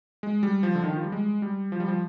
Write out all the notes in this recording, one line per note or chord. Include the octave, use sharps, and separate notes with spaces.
G#3
G3
F3
D3
D#3
F3
G3
G#3
G3
F3
G3
F3